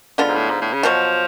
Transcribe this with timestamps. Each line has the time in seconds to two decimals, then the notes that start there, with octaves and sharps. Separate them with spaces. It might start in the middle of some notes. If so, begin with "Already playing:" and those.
0.18 D3 G#3 B3 F4
0.28 G#2
0.35 A2
0.50 G#2
0.61 A2
0.73 C#3
0.83 B2 F3 F#3 C#4 F#4